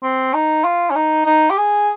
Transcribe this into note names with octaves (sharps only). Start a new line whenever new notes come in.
C4
D#4
F4
C#4
D#4
D#4
G4
G#4